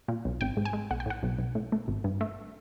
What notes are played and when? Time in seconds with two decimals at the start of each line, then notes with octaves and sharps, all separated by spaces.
0.08 A#2
0.25 B1
0.41 G#1 G5
0.57 G#2
0.65 G#5
0.73 G#3
0.91 B1 F#5
1.00 G5
1.06 A2 F#5
1.23 B1
1.39 B1
1.55 A2
1.72 A3
1.88 G#1
2.04 G2
2.21 A3